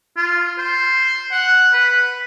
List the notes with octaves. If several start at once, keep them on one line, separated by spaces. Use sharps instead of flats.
F4
C5
F#5
B4